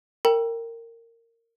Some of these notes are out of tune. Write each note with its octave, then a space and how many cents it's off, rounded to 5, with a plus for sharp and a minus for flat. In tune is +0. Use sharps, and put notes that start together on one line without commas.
A#4 -20 G5 +0 A#5 +45